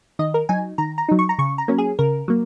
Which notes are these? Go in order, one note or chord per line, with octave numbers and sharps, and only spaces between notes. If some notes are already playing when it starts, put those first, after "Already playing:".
D#3 D#5
A#4
F#3 D#4 G#5
D#3 A#5
A#5
F#3 D#4
C#6
A#5
C#3 C#6
A#5
F#3 A#3 C#4
G#4
C#3 A#4
F#3 A#3